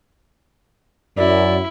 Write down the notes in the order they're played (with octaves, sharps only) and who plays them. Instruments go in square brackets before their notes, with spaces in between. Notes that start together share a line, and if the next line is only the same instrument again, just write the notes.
[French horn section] F#2 [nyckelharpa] E4 [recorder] D5